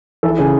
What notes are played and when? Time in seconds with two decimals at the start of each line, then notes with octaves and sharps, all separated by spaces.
0.23 E3 A4
0.39 C#3 G#4